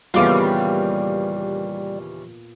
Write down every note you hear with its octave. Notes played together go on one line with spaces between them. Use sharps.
D#2 A#2 C#3 E3 G3 B3 F4 D6